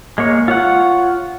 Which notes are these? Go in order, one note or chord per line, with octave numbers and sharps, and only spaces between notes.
G#3 A#3 C#5
F4 C#5 F#5